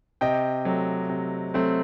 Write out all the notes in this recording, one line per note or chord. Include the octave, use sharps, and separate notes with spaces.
C3 D#5 G5
F#3 A3 C4
C3
F#3 A3 C4